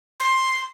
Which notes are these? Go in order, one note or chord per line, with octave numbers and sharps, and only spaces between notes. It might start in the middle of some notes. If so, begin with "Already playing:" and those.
C6